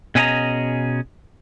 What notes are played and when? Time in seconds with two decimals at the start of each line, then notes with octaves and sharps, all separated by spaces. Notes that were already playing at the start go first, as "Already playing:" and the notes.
0.15 B2 C#4 G#4 A4 D#5 A#5